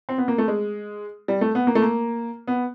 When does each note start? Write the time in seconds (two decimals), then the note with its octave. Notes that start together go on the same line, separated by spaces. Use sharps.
0.09 C4
0.18 B3
0.28 A#3
0.38 A3
0.48 G#3
1.28 G3
1.41 A3
1.55 B3
1.67 A#3
1.75 A3
1.82 A#3
2.47 B3